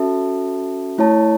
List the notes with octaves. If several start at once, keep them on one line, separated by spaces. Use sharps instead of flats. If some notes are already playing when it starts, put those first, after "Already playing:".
Already playing: C#4 F#4 A4 E5 A5
A3 E4 C#5 A5